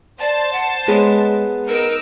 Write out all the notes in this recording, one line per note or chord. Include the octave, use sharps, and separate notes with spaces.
C5 D5 A5
F#5
G#3 B3 G#4 C#5
D#4 A#4 E6 D7